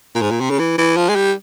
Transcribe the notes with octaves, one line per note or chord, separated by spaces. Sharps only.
A#2
G#2
A#2
C3
C#3
E3
E3
F3
G#3
G3